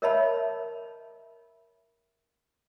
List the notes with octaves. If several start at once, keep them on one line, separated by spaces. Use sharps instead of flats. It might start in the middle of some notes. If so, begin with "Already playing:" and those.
A#4 C#5 D#5 E5 A5 B5